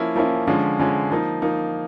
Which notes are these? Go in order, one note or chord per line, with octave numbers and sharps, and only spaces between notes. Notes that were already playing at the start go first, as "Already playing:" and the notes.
Already playing: F3 A#3 C#4 E4
F3 A#3 C#4 E4
D3 F3 G#3 C#4
D3 F3 G#3 C#4
F3 A#3 D#4
F3 A#3 D#4